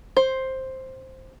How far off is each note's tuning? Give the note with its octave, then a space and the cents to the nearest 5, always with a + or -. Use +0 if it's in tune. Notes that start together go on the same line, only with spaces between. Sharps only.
C5 +5